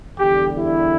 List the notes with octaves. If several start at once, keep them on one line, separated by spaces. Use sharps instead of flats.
E2 D3 G3 G4
E4